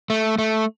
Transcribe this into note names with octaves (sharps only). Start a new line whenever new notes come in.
A3
A3